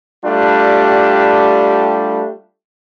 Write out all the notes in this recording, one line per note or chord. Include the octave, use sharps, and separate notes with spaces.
G3 A3 D4 F4 G4